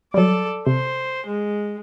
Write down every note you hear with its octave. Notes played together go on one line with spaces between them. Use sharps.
F#3 G3 A4 D5
C3 C5
G#3